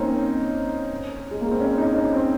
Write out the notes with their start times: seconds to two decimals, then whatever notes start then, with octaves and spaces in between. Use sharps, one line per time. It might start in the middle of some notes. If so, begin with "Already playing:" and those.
Already playing: A#3 C4 C#4 D#4
1.31 G#3
1.41 A#3
1.51 C4
1.61 C#4
1.77 D#4
1.95 C#4
2.13 C4